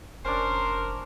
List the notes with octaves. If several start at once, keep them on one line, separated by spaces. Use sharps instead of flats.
F1 C#4 D4 A#4 C5